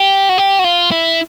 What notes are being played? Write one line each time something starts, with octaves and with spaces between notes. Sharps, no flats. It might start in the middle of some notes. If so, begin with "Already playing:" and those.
Already playing: G4
F#4
G4
F#4
F4
E4